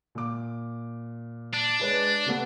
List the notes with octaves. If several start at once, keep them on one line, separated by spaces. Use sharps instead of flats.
A#2 D6
D4
G#3 B4 C#5
C3 A3 B3